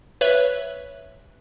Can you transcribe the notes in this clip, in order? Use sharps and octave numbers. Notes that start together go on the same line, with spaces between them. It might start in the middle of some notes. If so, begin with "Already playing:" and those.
B4 C#5 E5 F#6